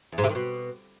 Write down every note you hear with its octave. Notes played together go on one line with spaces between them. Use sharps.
E2
G#2
C3
D#3
B2